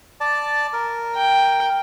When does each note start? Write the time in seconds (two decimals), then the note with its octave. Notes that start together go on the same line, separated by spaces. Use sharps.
0.21 D5 A5
0.73 A#4
1.16 G5